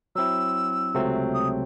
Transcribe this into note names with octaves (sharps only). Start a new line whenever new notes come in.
F#3 C4 E4 E6
C#2 C3 F#3 A3 C4
D#6